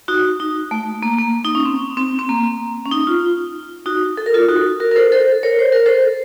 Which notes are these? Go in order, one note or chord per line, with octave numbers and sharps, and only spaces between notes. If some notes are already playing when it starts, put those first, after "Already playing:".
D#4 F#4
D#4
A3
A#3
A#3
D#4
C#4
C4
C4
C4
A#3
C#4
D#4
F4
D#4 F#4
A4
A#4
F4 A4
D#4 F#4
F#4 A#4
A#4
A4 C5
A4 C5
A#4 C#5
C5
A#4
A4 C5